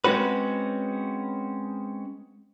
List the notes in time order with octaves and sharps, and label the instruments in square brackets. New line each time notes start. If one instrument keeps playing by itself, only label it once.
[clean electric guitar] G#3 C4 C#4 F#4 B4